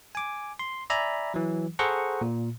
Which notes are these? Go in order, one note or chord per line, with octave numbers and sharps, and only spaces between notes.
G#5 D6
C6
D5 E5 G#5 A#5 B5
E3 F#3
G#4 A4 C5 F#5 A#5 C#6
A#2